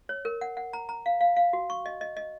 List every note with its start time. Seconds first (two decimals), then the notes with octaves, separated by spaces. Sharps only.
0.09 C#5
0.25 A#4
0.41 F#5
0.57 F#5
0.73 A#5
0.89 A#5
1.06 F5
1.21 F5
1.37 F5
1.53 F#4
1.70 C#6
1.86 D#5
2.01 D#5
2.17 D#5